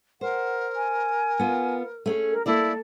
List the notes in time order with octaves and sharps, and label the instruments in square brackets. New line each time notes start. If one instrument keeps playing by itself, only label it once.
[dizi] A#4 [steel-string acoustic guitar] C5 [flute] F#5
[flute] G#5
[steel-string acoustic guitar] B3 F4
A3 C#4 G#4
[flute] A#4
[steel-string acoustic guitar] A3 A#3 D5 [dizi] E4 [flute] A4